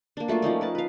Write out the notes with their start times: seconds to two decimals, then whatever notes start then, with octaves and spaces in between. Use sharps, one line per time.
0.17 A#3 D4
0.28 F#3 A3 A#3 F4
0.42 F3 C#4 D#4 D5
0.61 A#4 B4 A5
0.75 B4 F5